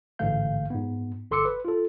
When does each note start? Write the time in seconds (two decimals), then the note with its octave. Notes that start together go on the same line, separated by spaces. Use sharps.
0.19 A1 G#2 D3 A3 F5 G6
0.70 G#2 B3
1.31 G1 A4 C6 D6 E6 C#7
1.45 B4
1.65 F4 A4